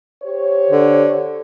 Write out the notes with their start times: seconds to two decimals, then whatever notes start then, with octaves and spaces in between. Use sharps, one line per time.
0.23 G4 C5 C#5
0.70 D3